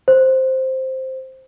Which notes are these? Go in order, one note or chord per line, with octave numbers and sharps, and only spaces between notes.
C5